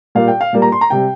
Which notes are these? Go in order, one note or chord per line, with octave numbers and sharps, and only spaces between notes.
A#2 G3 A#3 F5
G5
F5
A#2 G3 A#3
A#5
C6
A#5
C3 G3 G5